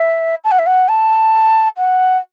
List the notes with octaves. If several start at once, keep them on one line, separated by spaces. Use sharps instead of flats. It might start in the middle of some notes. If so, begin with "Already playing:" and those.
Already playing: E5
A5
F#5
E5
F#5
A5
F#5